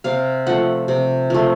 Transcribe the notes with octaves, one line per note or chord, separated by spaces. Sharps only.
C3 F5
F3 A3 F#5
C3
F3 A3